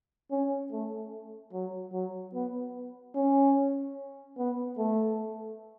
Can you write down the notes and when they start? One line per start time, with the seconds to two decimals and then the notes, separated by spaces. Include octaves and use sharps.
0.31 C#4
0.72 A3
1.53 F#3
1.93 F#3
2.34 B3
3.15 C#4
4.38 B3
4.78 A3